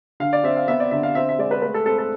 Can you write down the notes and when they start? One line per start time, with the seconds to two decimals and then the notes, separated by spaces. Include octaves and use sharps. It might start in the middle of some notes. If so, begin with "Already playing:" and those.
0.20 D3 F5
0.33 D5
0.43 C4 E5
0.56 F5
0.68 B3 E5
0.80 D5
0.91 D3 E5
1.03 F5
1.15 C4 E5
1.29 E5
1.39 G#3 D5
1.51 B4
1.62 A3 B4
1.74 A4
1.86 C4 A4
1.98 A4